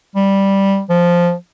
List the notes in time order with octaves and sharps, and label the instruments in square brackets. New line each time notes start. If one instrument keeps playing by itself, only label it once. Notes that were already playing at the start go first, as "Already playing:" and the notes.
[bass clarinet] G3
F3